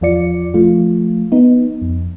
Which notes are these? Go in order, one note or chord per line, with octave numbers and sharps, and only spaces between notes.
E2 F3 F4 D5 C#7
F3 A3 F4
B3 D#4
F2